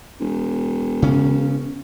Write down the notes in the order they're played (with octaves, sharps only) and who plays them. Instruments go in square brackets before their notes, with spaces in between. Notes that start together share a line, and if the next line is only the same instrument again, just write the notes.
[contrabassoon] E1
[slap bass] C#3 C#4